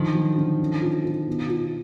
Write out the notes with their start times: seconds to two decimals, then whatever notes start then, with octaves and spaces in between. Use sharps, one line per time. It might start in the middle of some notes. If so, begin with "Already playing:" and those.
Already playing: D3 D#3 F3
0.15 F#3
0.38 D3
0.60 C#4
0.82 F4
1.05 F4
1.27 B2
1.49 F4